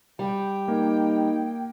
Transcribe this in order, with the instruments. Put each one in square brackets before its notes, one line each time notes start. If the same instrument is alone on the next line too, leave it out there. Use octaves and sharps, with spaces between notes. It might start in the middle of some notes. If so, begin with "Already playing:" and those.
[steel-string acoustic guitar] G3 [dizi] G5
[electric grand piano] A#3 [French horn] D#4